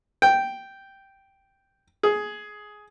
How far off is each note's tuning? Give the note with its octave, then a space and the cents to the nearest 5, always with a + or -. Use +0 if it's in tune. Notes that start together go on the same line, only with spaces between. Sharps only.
G5 -5
G#4 +10